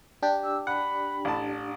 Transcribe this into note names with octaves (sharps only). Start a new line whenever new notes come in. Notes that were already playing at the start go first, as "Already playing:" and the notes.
D4 G4
E6
F#5 B5
A1 A5